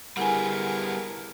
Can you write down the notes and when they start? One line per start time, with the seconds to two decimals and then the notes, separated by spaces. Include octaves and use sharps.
0.17 G3 B3 E4 G#4 A#4 F#5 G#5